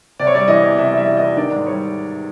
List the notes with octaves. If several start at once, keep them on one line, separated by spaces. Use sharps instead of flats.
C3 D5
C#5
G3 D5
E3 D#5
E2
C3 E5
G3
E5
E3
D#5
E2
D#3 D5
G#2
G3 C#5